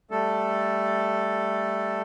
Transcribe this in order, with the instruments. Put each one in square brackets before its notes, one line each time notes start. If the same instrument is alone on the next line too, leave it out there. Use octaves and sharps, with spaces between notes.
[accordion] G3 A3 A4